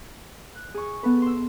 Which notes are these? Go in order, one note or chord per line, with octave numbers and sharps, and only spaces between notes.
F#6
G#4 C#6
B3 A4 B4
C6 E6